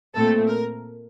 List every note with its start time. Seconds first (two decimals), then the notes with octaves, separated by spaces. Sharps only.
0.14 A#2 A3 C4 A4
0.48 A#4